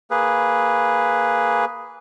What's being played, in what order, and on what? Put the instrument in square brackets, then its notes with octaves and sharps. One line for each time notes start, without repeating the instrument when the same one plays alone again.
[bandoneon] A#3 G#4 B4